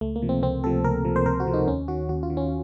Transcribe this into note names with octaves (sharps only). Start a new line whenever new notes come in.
C#2 A3
A#3
C3 F3
C4
C#2 C4
C3 F3 A4
C#2 A#4
C3 F3
C5
C#2 A#4
F#4
C3 F3
D#4
D#2 C#4
D#3 F#4
D#2 F#4
F4
D#3
C#4